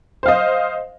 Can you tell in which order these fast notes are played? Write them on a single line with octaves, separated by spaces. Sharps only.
C5 F5 D#5